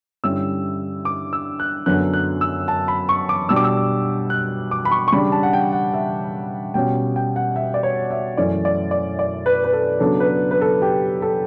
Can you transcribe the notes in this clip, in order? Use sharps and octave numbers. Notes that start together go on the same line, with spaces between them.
G2 D3 G3 C#4 E4 E6
D6
E6
F#6
F#2 D3 F#3 B3 D4 F#6
F#6
E6
A5
B5
C#6
D6
B2 G3 D4 E6
D6
E6
F#6
D6
B5
C#6
C#6
C#3 G3 D4 B5
A5
F#5
G5
F#5
E5
B2 G3 C#4 G5
G5
F#5
E5
D5
C#5
E5
F#2 E3 A3 C#4 E4 D5
D5
D5
D5
B4
B4
A4
C#3 F#3 B3 D4 A4
B4
B4
A4
G4
A4